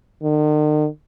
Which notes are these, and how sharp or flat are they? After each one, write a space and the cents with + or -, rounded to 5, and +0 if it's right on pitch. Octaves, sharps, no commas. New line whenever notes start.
D#3 -45